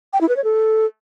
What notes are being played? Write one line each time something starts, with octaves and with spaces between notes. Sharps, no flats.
G5
E4
B4
C#5
A4